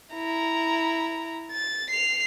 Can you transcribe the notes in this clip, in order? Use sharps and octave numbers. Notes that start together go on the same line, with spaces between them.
E4 A#5
A6
C7 F7